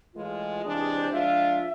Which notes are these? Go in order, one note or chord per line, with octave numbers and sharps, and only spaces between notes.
A2 E3 G#3 F4
C3 E3 G#3 D4 G#4
F4
G#4
C5
F3 G#3 D4 F4 E5